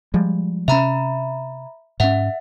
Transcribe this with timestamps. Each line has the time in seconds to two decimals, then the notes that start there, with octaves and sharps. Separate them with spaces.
0.14 F3 G3 G#3
0.68 C3 C#4 E5 A#5 B5
2.00 G#2 C#4 E5 F#5